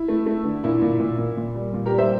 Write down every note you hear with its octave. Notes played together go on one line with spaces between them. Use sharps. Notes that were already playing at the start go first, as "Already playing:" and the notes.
Already playing: E4
A3
A3
D3
A#2 E4
A#2
A#2
A#2
A#2
G3
A#2
G4 A#4
G3
C5 E5